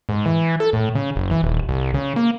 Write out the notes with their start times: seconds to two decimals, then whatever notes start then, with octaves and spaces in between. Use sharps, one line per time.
0.09 G#2
0.26 E3
0.60 A4
0.73 A2
0.95 C#3
1.16 F#1
1.31 E3
1.43 D#1
1.69 C2
1.94 C#3
2.16 A#3